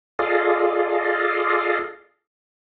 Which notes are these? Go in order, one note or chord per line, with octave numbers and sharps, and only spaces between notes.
F4 G#4 A4 D5 D#5 F5